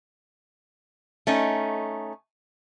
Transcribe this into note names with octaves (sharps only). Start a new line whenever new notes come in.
A3 C#4 D#4